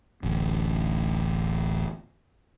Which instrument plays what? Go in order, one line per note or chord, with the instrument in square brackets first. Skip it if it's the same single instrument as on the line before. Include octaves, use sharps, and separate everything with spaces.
[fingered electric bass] D1 A1 D2